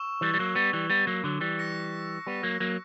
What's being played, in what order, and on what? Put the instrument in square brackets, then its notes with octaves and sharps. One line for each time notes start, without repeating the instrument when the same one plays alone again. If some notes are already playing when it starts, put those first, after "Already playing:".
Already playing: [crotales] C#6 E6 E7
[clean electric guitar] E3 G3
G3
F#3 A#3
G3 B3
E3 G3
G3 B3
F#3 A#3
D3 F#3
E3 G3
[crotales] F#6 A#6 C#7
[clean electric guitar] G3 B3
F#3 A#3
F#3 A#3